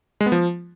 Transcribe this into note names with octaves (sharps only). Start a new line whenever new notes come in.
G#3
B3
F3